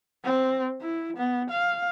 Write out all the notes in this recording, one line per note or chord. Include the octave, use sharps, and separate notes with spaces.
C4
E4
B3
F5